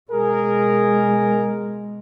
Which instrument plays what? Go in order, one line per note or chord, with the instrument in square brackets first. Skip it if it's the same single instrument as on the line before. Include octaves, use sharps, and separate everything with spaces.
[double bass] B2 G#3 [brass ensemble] G#4 A#4